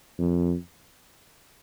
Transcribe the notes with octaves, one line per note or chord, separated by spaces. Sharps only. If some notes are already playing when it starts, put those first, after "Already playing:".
F2